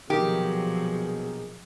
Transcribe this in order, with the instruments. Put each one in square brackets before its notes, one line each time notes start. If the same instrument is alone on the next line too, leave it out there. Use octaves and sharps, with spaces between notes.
[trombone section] A#1 B2 G#4 [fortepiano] D#3 [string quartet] F3 F#3 [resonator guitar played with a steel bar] G4